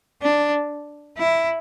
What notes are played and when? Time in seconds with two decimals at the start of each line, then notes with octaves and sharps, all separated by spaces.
0.22 D4
1.18 E4